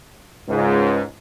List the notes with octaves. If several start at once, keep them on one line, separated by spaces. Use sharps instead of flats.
C#2 G#2